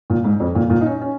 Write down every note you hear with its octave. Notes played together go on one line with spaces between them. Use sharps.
A#2
G#2
F2
A#2
A#2
D#4
C#4
C#4